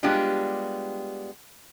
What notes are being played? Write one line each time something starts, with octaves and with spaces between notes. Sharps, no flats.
G3 G#3 B3 D4 F4 G4